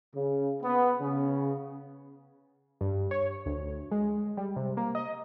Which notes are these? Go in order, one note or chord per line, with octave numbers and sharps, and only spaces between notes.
C#3
B3
C#3
G2
C#5
D2
G#3
G3
C3
A#3
D#5